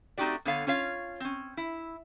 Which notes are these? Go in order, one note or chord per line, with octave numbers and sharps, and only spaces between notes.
A3 C4 D#4 F#4 G4 D5
D3 B3 A4 C#5 F5
C#4 F4 C#5 F5
C4 C#4
E4